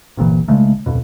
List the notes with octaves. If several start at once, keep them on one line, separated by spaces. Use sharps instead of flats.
G1 C2 A#2 E3
B1 C#3 G#3 A3
D1 F2 B2